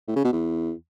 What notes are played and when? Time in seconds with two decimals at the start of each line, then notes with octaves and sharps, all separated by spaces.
0.08 A2
0.16 C#3
0.24 B2
0.33 E2